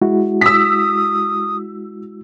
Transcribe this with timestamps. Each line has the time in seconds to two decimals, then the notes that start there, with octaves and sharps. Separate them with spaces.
0.01 G#3 E4 F#4
0.41 D#6 E6 B6